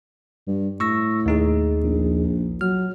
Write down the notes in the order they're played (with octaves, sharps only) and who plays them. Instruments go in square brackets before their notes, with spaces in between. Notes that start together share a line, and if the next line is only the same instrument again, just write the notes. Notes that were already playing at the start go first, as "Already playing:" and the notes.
[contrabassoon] G2
[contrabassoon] A2 [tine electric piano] C#6 E6 A#6
[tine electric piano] D#2 D#4 G#4
[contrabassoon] A#1
[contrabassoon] F#3 [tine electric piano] F6